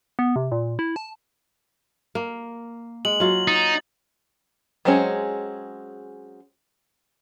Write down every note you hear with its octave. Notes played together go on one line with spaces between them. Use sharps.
B3
C3
A#2
E4
A5
A#3
G#3 F#7
F#3 F4
D#4 A6
F#3 G#3 C4 C#4 G#4